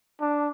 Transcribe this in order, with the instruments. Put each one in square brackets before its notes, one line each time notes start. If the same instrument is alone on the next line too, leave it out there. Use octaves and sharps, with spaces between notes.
[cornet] D4